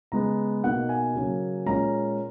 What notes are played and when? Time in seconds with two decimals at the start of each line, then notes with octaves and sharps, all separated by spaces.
0.12 C#3 G#3 B3 A#5
0.64 B2 A#3 D#4 F#5
0.89 G#5
1.14 C#3 F#3 A#3 C#4
1.66 A#2 G#3 C#4 A#5